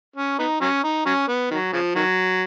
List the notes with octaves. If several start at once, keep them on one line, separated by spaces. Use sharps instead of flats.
C#4
B3 D#4
F#3 C#4
D#4
F#3 C#4
B3
D#3 F#3
C#3 F3
D#3 F#3